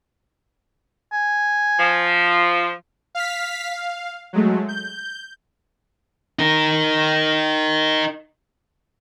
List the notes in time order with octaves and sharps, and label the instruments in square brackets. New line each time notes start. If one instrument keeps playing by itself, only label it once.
[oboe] G#5
[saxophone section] F3
[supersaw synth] F5 F6 B6
F5
F#3 G#3 A3
G6
[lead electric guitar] D#4 A#4